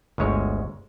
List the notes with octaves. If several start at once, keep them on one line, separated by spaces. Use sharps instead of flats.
G1 D2 G#3 C#5